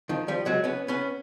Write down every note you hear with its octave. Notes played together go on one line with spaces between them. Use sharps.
D#3 F3
F3 G3
F#3 G#3
B3 C#4
B3 C#4